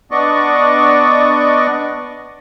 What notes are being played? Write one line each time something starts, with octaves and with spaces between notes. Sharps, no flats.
B3 D4 D5 D#5 C#6